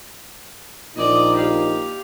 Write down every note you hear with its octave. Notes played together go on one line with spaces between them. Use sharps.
A#1 A#2 D#4 D5 D#5
G4 F5